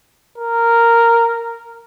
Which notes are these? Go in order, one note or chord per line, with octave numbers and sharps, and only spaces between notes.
A#4